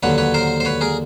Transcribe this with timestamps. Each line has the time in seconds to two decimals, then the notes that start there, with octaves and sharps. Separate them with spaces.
0.03 D#2 D3 F#3 B4 C#5
0.18 B4 C#5
0.34 A#4 C5
0.60 C5
0.65 B4 C#5
0.81 G#4 A#4